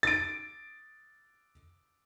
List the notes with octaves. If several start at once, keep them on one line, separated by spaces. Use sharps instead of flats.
A6 D7